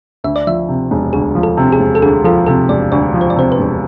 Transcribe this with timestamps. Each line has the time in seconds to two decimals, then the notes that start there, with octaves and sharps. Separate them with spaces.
0.24 D2 E5
0.36 D5
0.47 F3 E5
0.69 C3
0.91 E1
1.13 D2 G#4
1.35 F3
1.43 A4
1.57 C3
1.72 G#4
1.80 E1
1.95 A4
2.02 D2 G#4
2.24 F3 A4
2.46 C3 A4
2.69 E1 D5
2.92 D2 D5
3.14 F3
3.21 C5
3.30 D5
3.36 C3 C5
3.52 B4
3.59 E1